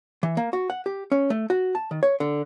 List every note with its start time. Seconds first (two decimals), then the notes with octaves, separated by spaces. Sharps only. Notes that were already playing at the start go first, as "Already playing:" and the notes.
0.23 E3
0.37 A#3
0.53 F#4
0.70 F#5
0.86 G4
1.12 C#4
1.30 A3
1.50 F#4
1.75 A5
1.91 D#3
2.03 C#5
2.20 D3